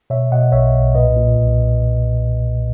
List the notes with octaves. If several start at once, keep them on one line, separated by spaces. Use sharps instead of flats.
B2 C#5 E5
B2 D#5 F#5
B1 C#5 E5
B1
A#2 B4 D#5
A#2
B1